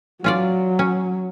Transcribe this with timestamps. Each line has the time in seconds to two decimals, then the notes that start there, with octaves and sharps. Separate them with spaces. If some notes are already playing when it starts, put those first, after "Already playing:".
0.24 F#3 C#4 F4 D5
0.79 C#4